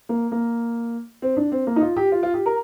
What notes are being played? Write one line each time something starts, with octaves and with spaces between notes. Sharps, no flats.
A#3
A#3
C4
D4
C4
A#3
D#4
F4
G4
F4
F4
G4
A#4